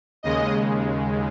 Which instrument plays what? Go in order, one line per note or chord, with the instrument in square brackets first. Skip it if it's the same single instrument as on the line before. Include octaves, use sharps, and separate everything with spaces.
[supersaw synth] D#2 C#3 G#3 D#5